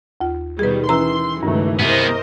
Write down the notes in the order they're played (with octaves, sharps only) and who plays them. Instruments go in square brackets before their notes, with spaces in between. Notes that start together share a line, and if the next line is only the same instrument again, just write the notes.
[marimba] D#2 F4
[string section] B2 D#3 G3 [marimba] G#4 B4
[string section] D#3 C6 [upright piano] E3 B4 E6 [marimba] C#4 A#5
[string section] C#2 E3 F#3 [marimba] G2 [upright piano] D#3 A3
[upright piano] C2 [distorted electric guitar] B3 G#4 [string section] A#4 C5 D#5